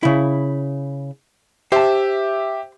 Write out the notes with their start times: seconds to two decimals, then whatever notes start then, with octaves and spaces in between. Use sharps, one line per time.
0.03 C#3 E4
1.72 G4 C5 E5 A5